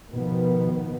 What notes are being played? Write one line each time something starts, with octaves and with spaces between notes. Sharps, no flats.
B2 D#3 F3 B3